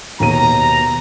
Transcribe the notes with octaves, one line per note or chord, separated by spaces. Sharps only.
D#2 B2 A#5 D#7